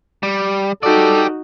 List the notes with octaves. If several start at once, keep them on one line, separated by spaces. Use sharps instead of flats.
G3
D#4 F#4 G4 A4 D5